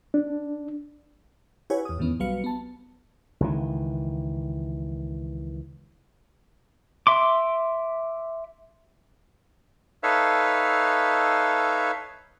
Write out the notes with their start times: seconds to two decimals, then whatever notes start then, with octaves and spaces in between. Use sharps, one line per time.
0.14 D4
1.70 E4 G4 B4 C#5 F#5 G#5
1.85 E2 D#6
1.98 E2 G#2 D#3 E3 B3 C#4
2.20 B1 F#3 G3 B4 F5 C#7
2.44 B3 A5
3.40 C#2 D#3 E3
7.07 E5 C6 D6
10.03 D#4 A4 B4 C#5 E5 F5